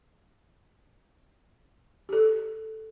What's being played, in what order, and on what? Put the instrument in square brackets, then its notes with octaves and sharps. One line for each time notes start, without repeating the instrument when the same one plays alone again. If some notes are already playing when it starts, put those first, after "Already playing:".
[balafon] G4 A4